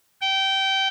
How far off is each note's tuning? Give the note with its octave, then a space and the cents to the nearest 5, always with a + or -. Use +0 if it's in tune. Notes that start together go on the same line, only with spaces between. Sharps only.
G5 -20